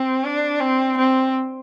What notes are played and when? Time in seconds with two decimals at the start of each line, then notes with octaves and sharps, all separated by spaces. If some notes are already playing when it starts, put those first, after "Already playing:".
Already playing: C4
0.24 D4
0.60 C4
0.98 C4